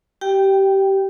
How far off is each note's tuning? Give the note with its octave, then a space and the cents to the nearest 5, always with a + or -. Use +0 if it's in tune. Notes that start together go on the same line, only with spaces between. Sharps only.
G4 -20 G5 +0